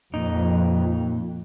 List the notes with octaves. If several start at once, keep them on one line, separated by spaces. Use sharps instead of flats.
F2 A#2 D#4